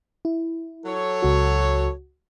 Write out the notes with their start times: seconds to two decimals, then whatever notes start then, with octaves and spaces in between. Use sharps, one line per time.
0.25 E4
0.86 F#3 A4 C#5
1.23 C#2 F#4